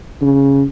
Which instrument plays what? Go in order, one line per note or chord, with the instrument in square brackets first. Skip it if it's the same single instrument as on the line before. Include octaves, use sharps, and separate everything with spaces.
[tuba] C#3